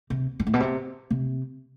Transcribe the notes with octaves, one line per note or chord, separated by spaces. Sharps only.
C3
G#2
A2
B2
C3
C3